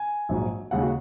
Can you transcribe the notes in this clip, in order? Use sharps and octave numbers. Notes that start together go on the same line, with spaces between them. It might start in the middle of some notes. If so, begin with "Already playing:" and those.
Already playing: G#5
A#1 G#2 F#3
D#2 C#3 G#3 F#5
F#4